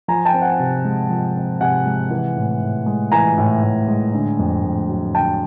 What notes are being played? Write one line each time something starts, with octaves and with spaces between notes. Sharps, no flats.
F3 G#5 A#5
G5 A5
C4
F#5 G#5
C3
G#3
F3
C4
C3 F#5 G#5
G#3
E3
A2
A2
G#3
E3 G#5 A#5
A2
A2
G#3
D3
F2
F2
F#3
D3 G5 A5